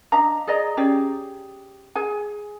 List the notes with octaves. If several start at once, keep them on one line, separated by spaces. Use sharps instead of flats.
D4 D#5 F5 A#5
G#4 D5 D#5 A#5
C#4 G4 G#4 D5
G#4 G#5